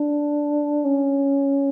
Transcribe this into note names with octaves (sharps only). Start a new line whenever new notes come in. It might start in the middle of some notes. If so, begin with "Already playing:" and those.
Already playing: D4
C#4